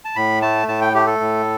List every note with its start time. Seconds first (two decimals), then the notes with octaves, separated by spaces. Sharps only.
0.05 A5
0.16 A2 B5
0.42 A3 A5
0.68 A2 A5
0.81 G5
0.94 A3 G4
1.07 A4
1.20 A2